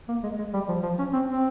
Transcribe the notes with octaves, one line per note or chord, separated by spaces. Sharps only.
A#3
G#3
G#3
G3
F3
F3
C#4
C4
C4